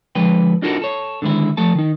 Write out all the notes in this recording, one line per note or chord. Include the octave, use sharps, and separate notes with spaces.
D3 F3 G#3 B4 G5
D4 D#4 F4 F#4 A4 A#4
A4 C#5
D3 D#3 G#3 E4
F3 A3 A4 A5
D#3 D#4